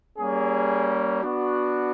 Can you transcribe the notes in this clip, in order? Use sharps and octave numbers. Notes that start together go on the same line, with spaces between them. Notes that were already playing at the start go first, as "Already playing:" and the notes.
G3 A#3 C#4 G#4
B3 D4 F#4